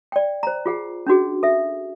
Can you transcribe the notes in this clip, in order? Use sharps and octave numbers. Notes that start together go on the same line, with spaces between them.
D5 G5
C5 A#5
F4 G#4 F#5
C#4 D4 F#4 G#4
A4 E5